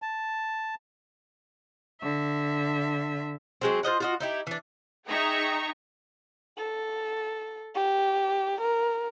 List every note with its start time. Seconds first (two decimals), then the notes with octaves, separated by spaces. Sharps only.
0.02 A5
2.01 D3 E5
3.61 F#3 G#3 C4
3.83 F4 C5 D#5 F#5
4.00 F4 F#4 D#5
4.20 D#4 E4 G4
4.47 E3 D4
5.07 D#4 G#4 E5 G5 A#5 C#6
6.58 A4
7.75 G4
8.61 A#4